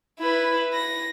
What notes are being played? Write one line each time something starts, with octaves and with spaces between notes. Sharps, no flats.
E4 B4
A#6